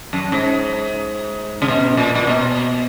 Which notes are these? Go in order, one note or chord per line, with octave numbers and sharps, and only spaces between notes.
F#2
G#2
C#3
B2
A#2
A#2
B2